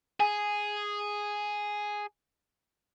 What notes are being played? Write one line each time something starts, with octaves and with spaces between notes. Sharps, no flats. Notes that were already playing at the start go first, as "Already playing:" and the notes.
G#4 G#5